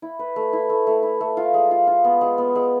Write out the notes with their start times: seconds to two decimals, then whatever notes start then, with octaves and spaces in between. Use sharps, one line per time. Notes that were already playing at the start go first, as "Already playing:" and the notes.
0.02 E4
0.19 B4
0.36 A3
0.53 E4
0.70 A3
0.87 A3
1.03 E4
1.21 A3
1.37 F4
1.54 G#3
1.71 F4
1.87 F4
2.04 B3
2.21 G#3
2.38 B3
2.55 G#3